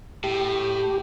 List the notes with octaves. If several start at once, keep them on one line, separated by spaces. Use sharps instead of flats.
A2 G4